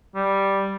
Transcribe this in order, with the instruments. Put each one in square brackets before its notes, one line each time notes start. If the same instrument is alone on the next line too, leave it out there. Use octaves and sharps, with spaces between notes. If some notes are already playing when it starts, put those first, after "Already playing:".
[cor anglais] G3